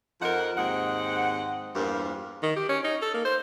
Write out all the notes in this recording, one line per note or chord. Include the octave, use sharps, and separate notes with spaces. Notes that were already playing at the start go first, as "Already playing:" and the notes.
F2 F3 D#4 A#4 F#5
D#2 G#2 C4 D#5 F#5
E2 G2 F3 A#3 F4 A#4
D#3
G4
C#4
D#4
A4
A#3
C5